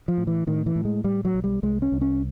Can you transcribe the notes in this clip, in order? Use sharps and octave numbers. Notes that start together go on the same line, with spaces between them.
F3
A2
E3
A2 D#3
E3
A2
G#3
A2 G3
F#3
B1
G3
C2 G#3
C#4
C2
C#4